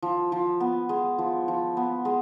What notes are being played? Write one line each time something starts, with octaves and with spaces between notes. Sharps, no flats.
F3
F3
B3
G#3
F3
F3
B3
G#3